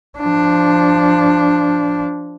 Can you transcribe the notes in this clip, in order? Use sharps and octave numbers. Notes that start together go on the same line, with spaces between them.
F3 D4